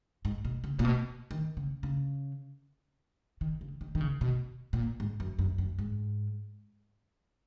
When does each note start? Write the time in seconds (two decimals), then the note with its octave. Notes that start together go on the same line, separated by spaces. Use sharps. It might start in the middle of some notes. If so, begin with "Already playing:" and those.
0.25 G#2
0.45 B2
0.64 C#3
0.79 A#2
0.85 B2
1.31 D#3
1.57 C#3
1.83 C#3
3.41 D#3
3.61 C#3
3.81 D#3
3.95 D#3
4.01 C#3
4.21 B2
4.73 A#2
5.00 G#2
5.20 F#2
5.39 F#2
5.58 F#2
5.79 G#2